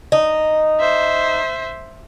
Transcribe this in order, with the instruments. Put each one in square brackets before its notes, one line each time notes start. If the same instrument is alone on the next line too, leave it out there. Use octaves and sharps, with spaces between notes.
[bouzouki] D#4
[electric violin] C5 E5